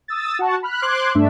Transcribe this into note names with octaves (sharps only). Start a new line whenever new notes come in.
D#6 E6 A6
F#4 F#5 A5 C#6
B5 F6 F#6
C5 C6 D6 F#6 G#6
G2 A3 D4 E5